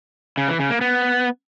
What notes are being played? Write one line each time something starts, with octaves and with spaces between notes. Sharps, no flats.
C#3
E3
C#3
A#3
B3